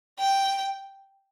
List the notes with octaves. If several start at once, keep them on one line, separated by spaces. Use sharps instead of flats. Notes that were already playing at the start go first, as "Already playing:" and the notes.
G5